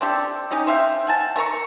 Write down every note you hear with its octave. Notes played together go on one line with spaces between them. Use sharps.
C4 D4 G4 A4
C#4 D#4 G4 D#5
C5 E5 F5 G5
F#5 G#5 A5
A3 A#4 A#5 C#6